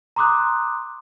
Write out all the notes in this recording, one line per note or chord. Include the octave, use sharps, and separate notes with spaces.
A#5 C6 D6 D#6 F#6